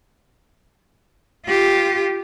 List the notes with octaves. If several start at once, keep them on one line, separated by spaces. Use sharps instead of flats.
F4 G4